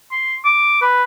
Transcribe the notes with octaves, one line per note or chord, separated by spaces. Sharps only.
C6
D6
B4